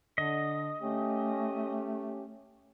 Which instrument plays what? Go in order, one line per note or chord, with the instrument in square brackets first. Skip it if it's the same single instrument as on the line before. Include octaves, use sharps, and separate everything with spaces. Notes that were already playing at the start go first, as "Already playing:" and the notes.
[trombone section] D3 [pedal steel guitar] D#5
[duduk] A3 [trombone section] C#4 G4